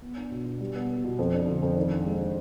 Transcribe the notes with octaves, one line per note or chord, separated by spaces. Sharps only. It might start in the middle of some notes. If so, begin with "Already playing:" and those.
B3
D4
B2
B2
G3
B3
B3
B2
F2
D4
D3
F2
D#3
D4
G#3
D#3